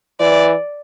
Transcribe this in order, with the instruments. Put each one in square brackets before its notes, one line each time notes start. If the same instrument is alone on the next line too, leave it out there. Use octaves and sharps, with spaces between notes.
[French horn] E3 [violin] D5